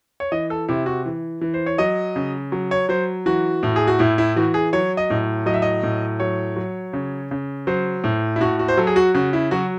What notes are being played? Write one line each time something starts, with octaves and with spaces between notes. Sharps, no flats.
C#5
E3 D#5
A4
C3 E4
F#4
E3
E3
C5
C#5
F#3 D#5
C#3
F#3
C#5
F#3 C5
E3 F#4
A2
G#4
F#4
A2 E4
E4
E3 F#4
G#4
F#3 C#5
D#5
A2
F#3 D#5
E5
D#5
A2
F#3 C#5
F#3
C#3
C#3
F#3 C5
A2
E4
A2 F#4
F#4
C5
F#3 A4
G#4
F#4
C#3 F#4
E4
F#3 F#4